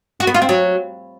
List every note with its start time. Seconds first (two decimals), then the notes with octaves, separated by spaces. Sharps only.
0.20 F#4
0.27 B3
0.34 F4
0.42 C4
0.49 F#3